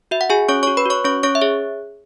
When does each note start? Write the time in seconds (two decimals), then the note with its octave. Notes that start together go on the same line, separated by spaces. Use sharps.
0.11 F#4 E5
0.21 F#5
0.30 F#4 G#4 G#5
0.49 C#4 C#5 C#6
0.63 F#4 C#5 C#6
0.77 B4 B5
0.86 F#4 C#5 C#6
1.04 C#4 C#5 C#6
1.23 C#4 C#5 C#6
1.35 E5
1.41 G#4 C#5